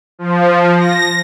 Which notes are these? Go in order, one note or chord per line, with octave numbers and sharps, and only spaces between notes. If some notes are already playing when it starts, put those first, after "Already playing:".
F3
A#6